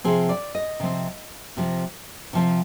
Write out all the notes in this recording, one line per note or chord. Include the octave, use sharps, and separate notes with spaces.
C3 F3 C4 G#4
D5
D#5
C3 F3 C4
C3 F3 C4
C3 F3 C4